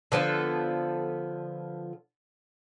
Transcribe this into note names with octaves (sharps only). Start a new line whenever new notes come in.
D3 F3 B3 A4